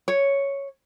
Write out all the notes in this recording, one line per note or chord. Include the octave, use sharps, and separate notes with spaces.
C#5